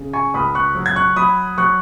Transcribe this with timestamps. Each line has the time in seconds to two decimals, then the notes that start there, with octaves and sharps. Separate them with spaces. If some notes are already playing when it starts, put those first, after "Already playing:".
Already playing: C#3
0.13 G#5 C#6
0.34 C#2 B5 D#6
0.55 C#6 F#6
0.75 F#3
0.86 G#6
0.96 C#6 F#6
1.16 F#3 B5 D#6
1.58 F#3 C#6 F#6